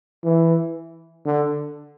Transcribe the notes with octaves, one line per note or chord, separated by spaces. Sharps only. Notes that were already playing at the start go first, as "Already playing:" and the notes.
E3
D3